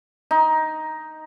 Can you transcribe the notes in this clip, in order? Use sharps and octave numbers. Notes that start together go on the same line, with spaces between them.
D#4